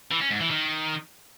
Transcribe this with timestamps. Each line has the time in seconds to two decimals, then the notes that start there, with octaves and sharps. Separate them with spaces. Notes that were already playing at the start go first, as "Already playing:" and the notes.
0.11 E3
0.21 C#4
0.31 G#2
0.41 E3
0.50 D#3